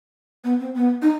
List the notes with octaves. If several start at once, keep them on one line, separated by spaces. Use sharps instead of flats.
B3
C4
B3
D#4